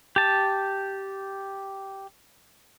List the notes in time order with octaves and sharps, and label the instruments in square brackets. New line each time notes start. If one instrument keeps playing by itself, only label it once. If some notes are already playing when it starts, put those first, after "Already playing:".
[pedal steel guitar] G4 A5